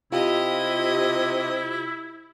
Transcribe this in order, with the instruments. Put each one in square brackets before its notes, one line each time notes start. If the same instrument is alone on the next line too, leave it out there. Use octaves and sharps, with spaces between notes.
[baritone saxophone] C3 [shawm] E4 [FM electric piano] F4 G4 [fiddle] D#5